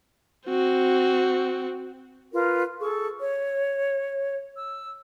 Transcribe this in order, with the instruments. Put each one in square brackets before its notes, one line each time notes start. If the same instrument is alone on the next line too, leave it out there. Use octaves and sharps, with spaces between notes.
[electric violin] C4 F#4
[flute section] F4 A#4 B4
G#4 A4 C#6
C#5
E6